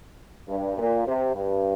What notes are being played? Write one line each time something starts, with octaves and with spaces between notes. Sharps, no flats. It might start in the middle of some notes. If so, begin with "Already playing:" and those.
G2
A#2
C3
G2